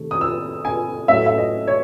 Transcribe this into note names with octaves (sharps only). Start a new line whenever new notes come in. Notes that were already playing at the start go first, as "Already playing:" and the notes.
Already playing: C3 D#3 A3
D#6
E6
G#5
A2 F#3 C#4 E5
E5
D#5
C#5